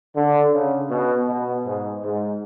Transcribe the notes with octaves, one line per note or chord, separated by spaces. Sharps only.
D3
C#3
B2
B2
G#2
G#2